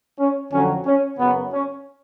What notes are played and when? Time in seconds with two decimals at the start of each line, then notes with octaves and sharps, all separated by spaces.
0.19 C#4
0.52 F2 D3 F#3 C#4
0.86 C#4
1.19 F#2 C#3 F#3 B3
1.52 C#4